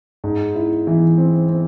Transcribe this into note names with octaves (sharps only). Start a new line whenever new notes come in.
G#2
E4
E3
C4
C4